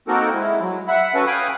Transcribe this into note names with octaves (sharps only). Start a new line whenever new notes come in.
A#3 C4 D#4 F#4 A4 A#4
G#3 E4
F#3
E5 F#5 B5
C#4 F#4 A4 B4
F5 G5 G#5 B5 D#6 F#6